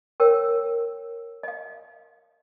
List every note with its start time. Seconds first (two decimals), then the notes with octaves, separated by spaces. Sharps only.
0.20 A#4 C#5 G5 E6
1.43 D#5 F5